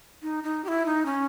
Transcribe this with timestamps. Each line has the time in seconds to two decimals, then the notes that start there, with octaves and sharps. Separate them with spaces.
0.23 D#4
0.44 D#4
0.64 G4
0.68 E4
0.86 D#4
1.06 C#4